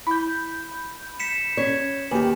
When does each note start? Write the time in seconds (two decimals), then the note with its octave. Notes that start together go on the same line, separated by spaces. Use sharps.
0.07 E4 B5 G6
1.20 B6 C#7 E7
1.57 C#4 C#5
2.11 D#2 G4 B4 G#5